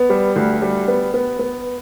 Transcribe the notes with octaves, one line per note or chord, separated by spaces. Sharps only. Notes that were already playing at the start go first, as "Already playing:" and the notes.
Already playing: B3
G3
D2
G3
B3
B3
B3